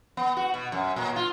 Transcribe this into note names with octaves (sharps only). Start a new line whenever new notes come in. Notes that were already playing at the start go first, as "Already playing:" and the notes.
B3
F#4
B2
F#2
A#2
F4